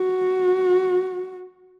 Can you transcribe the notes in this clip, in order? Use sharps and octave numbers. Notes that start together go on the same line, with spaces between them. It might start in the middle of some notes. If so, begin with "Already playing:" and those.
Already playing: F#4